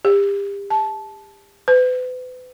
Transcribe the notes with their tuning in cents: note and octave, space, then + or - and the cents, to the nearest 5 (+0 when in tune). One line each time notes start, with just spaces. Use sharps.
G4 +35
A5 -15
B4 +40